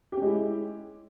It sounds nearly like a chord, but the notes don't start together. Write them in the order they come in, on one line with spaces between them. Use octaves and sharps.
G4 C#4 G#3 E4